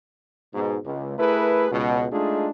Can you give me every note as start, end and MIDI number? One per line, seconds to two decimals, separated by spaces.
0.54 0.77 44
0.54 0.77 47
0.85 1.15 37
1.19 1.67 57
1.19 1.67 64
1.19 1.67 68
1.19 1.67 70
1.19 1.67 71
1.72 2.06 37
1.72 2.06 47
2.12 2.49 56
2.12 2.49 57
2.12 2.49 62
2.12 2.49 63
2.12 2.49 65
2.12 2.49 68